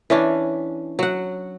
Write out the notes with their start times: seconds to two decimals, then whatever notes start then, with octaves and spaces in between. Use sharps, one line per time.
0.10 E3 C#4 D4
0.99 F#3 F#5